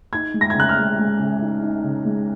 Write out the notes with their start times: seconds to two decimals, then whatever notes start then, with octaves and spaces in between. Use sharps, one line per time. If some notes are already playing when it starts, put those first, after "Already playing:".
0.13 D#4 G#6
0.34 G#3
0.41 A#6
0.50 G#6
0.55 C#3 F#6
0.69 F6
0.78 G#3
0.98 G#3
1.19 C#3
1.42 D#4
1.62 D#4
1.83 C#3
2.05 G#3